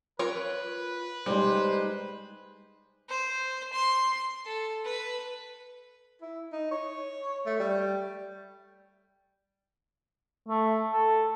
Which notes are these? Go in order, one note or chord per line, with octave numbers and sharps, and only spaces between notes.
F4 A#4 B4 C#5
G3 G#3 D#4 C5
C5
C6
A4
B4
E4
D#4
C#5
A3
G3
A3
A4